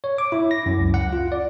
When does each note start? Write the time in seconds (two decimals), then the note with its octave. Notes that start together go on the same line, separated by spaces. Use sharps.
0.04 C#5
0.18 D6
0.32 E4
0.51 A#6
0.66 F#2
0.79 C#2
0.94 F#5
1.13 F4
1.32 D5